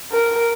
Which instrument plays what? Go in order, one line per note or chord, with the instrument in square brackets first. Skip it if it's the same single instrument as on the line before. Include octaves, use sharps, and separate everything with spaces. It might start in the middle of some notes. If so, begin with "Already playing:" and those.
[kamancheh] A#4